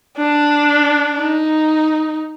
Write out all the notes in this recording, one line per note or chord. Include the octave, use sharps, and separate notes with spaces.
D4
D#4